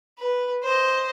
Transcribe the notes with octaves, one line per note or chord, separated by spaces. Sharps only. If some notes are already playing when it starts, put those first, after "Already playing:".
B4
C5 D#5